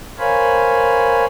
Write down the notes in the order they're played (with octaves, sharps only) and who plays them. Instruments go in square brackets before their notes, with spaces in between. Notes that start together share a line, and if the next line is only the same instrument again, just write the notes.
[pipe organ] A#4 C5 C#5 F5 G#5 B5